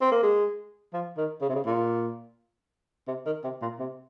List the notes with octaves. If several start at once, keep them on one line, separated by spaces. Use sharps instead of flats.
C4
A#3
G#3
F3
D#3
C#3
C3
C#3
A#2
C3
D#3
C3
A#2
C3